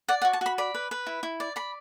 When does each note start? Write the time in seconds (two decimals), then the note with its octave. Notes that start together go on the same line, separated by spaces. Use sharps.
0.08 D5 F#5
0.22 F#5
0.25 F#4
0.33 A5
0.41 F#4 B5
0.58 D5 B5
0.74 B4
0.91 B4
1.06 E4
1.23 E4
1.40 D5
1.56 D5 B5